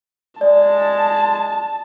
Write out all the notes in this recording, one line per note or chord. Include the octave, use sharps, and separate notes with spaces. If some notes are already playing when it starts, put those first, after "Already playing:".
G#3 D5 A5